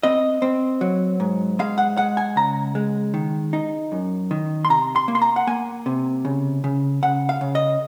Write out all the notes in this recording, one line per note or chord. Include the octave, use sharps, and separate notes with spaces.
C4 D#5
C4
F#3
G#2
G#3 F5
F#5
G#3 F#5
G#5
C#3 A#5
G#3
D#3
D#4
F#2
D#3
C6
C3 A#5
C6
A#3
C6
A#5
F#5
A#3 G#5
C3
C#3
C#3
C#3 F#5
F5
C#3
D#5